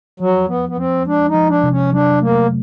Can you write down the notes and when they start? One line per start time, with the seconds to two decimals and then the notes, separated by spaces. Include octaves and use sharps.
0.20 F3 F#3
0.48 F3 B3
0.69 B3
0.77 F3 C4
1.07 G#3 D4
1.29 D#4
1.35 F3
1.49 D4
1.64 C3
1.71 C#4
1.93 F#3 D4
2.21 A3 A#3